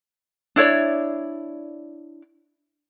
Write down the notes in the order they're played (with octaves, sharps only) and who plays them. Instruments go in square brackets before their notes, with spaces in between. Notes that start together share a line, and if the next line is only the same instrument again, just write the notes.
[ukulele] D4 E4 C#5 D5